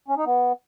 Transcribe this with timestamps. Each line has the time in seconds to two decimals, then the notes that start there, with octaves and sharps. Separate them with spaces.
0.08 C#4
0.17 D#4
0.26 B3